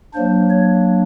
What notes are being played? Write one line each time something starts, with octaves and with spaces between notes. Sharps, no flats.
F#3 A#3 D4 C5
C#5